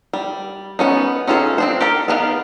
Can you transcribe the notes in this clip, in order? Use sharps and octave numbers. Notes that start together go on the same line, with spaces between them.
G3
B3 C#4 D#4
C#4 D#4 F4 G#4 A4
C4 D4 C5
G4 A4 A#4
B3 D4 D#4 F5